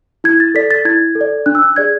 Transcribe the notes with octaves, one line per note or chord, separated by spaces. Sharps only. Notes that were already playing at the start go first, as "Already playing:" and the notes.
E4 G#6
A6
A4 D5 B6
A6
E4 G#6
A4
D5
D4 F#6
E6
F#6
G#4 D5 G#6